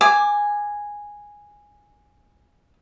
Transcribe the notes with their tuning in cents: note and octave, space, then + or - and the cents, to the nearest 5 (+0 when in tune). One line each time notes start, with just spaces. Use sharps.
G#5 -5 D6 +20